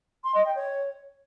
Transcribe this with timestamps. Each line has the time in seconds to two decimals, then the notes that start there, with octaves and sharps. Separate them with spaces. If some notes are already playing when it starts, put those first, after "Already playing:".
0.24 C6
0.34 D#5
0.45 G5
0.56 C#5